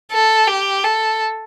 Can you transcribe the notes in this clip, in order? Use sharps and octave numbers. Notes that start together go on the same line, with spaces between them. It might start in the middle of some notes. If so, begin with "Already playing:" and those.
A4
G4
A4